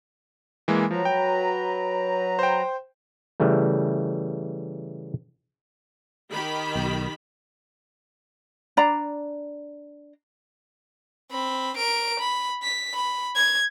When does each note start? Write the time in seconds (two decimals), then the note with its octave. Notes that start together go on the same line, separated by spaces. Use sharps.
0.68 E3 G#3 A#3
0.91 F3 F#3 B4 A#5
1.05 G5
2.39 C5 G5
3.40 C#3 E3 G3 A3
6.32 D#3 G4 B5
6.75 B1
8.77 D4 D5 A#5
11.31 C4 B5
11.77 A#4 D7
12.19 B5
12.63 B6
12.94 B5
13.36 G#6